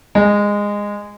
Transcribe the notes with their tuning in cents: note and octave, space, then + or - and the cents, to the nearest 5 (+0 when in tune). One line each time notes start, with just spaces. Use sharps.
G#3 -15